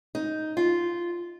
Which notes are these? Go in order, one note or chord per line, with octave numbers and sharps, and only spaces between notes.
D#4
F4